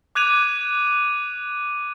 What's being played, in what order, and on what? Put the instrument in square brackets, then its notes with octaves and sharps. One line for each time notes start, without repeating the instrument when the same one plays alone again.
[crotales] D6 F#6 G#6 D#7 F7